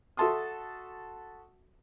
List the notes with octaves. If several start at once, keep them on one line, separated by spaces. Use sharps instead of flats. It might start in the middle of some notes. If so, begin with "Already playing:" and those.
F#4 A4 E5 A5 C6 D#6